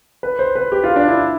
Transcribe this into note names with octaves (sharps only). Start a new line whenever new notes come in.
B4
C5
B4
G4
F4
D4
E4